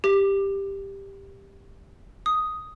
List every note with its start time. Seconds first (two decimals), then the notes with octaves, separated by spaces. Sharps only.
0.04 G4
2.26 D#6